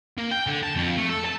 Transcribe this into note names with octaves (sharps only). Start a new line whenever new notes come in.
A#3
G5
D3
A5
F2
A3
A4
A5